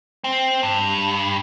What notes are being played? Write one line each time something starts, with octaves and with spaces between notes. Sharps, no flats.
C4
G2